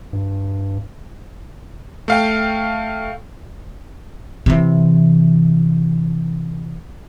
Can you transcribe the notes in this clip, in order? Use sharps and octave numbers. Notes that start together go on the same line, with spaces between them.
G2
A3 F5 G5
C3 E3